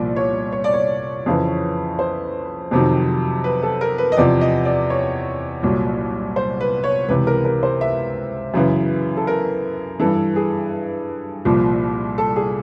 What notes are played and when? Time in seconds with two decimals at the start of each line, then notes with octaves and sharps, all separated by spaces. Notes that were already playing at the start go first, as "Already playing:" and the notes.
Already playing: C2 A#2 F3 D5
0.16 C#5
0.52 C#5
0.64 D5
0.74 C#5
1.26 F2 C#3 E3
1.99 C5
2.71 F2 C3 D#3 F#3
3.44 B4
3.63 A4
3.81 A#4
3.98 B4
4.12 D#5
4.17 E2 C3 F3 D5
4.41 D#5
4.65 D5
4.90 C#5
5.63 C2 A#2 F#3
6.36 C5
6.61 B4
6.84 C#5
7.08 C#2 C3 E3 B4
7.27 A#4
7.45 A#4
7.63 C5
7.81 E5
8.54 F#2 C#3 E3
9.17 A4
9.27 A#4
10.00 G2 E3 A4
10.36 G#4
11.45 C2 A#2 F3
12.18 A4
12.36 G#4